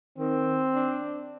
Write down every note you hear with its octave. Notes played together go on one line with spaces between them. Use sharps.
D#3 C4
D4